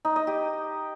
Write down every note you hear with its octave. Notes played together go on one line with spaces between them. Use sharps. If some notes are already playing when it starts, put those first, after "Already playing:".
D#4
D#5
G4